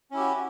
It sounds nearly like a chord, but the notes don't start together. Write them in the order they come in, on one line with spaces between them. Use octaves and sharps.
C#4 E4 G4 F#4